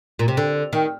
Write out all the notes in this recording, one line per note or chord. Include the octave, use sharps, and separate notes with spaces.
A#2
C3
D3
D#3